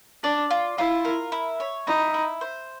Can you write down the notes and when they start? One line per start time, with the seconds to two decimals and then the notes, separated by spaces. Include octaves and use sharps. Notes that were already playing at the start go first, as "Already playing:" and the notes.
0.23 D4 D5
0.51 F4
0.78 E4 F4
1.05 A#4
1.32 E4
1.60 C#5
1.87 D#4 E4
2.14 E4
2.41 C5